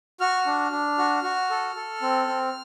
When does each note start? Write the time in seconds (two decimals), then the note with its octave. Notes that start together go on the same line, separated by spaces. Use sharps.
0.20 F#4 F6
0.46 D4
0.72 D4
0.98 F#4
1.24 F#4
1.50 A4
1.76 A4
2.02 C4
2.27 C4